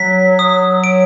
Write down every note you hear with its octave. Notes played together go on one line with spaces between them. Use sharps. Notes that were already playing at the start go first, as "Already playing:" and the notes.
Already playing: F#3 B6
D#6
D7